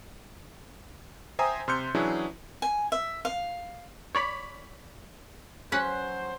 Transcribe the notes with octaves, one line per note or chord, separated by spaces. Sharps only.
C5 E5 G5 G#5 A#5 D#6
C3 C6 F6 G6 C#7
E3 F#3 C#4 D4 E4 G#4
G#5
E5
F5
C#5 D5 B5
F#3 C#4 B4 C5 F#5